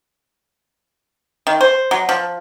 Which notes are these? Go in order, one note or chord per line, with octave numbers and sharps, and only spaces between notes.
D#3
C5
F#3
F3